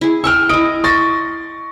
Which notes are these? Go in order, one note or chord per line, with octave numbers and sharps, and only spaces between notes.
E4 G#4
G5 A5 C#6 E6 F6
E4 D#5 D#6 D7
C6 C#6 A6 A#6